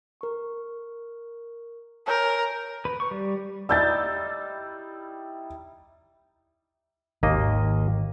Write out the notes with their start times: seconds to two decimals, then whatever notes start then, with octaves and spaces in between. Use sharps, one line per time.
0.21 A#4 C#6
2.08 A#4 C#5 G#5 G6
2.85 B4
3.00 C#6
3.11 G3
3.69 G3 D#4 E4 E6 G6 A6
7.23 G#1 D#2 A#3 D#5